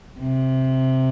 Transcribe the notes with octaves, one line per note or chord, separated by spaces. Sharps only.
C3